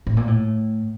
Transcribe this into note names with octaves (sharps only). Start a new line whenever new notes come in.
A2
A#2
A2